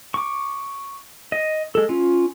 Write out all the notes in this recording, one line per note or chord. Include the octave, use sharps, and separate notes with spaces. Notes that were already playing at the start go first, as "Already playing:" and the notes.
C#6 D6
D#5
G#3 A4
C#4 F4